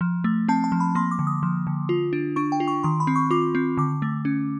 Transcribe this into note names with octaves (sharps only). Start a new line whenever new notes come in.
F3
A3
C4 A5
A5
F3
B5
A#3 C6
D6
D3
D#6
F3
D3
F4
D4
D4 C#6
G5
F4
C#6
D#3 C6
B5
C4
C#6
F4 D6
C4
D3 D6
A3
C#4